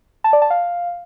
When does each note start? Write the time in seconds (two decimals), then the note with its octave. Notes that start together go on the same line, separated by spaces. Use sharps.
0.24 A5
0.33 D5
0.42 A5
0.50 F5